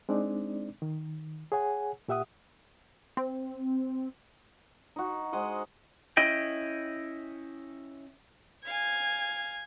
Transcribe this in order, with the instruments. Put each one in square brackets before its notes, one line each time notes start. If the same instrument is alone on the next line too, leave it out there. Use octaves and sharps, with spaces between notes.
[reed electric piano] G#3 C4 D4 D#4 D5
D#3
G#4 C#5 F#5 G#5
A#2 G4 E5 F#5 D#6
[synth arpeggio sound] C4
[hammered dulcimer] D#4 F#4
G#3 C5 D#5 F#5
[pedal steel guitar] C#4 E4 D#5 G5
[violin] F5 G#5 [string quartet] G#6